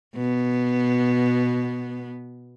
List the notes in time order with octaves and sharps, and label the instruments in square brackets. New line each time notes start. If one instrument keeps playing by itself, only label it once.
[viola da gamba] B2 B3